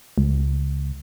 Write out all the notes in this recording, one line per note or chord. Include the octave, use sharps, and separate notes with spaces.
C#2